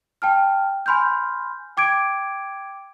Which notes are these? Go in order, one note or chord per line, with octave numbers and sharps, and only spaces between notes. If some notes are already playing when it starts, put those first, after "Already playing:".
G5 A5 F6
G#5 B5 C6 F6 G6
G5 D6 G#6 D7